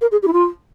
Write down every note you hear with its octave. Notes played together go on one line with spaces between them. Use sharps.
A#4
G#4
G4
E4
F4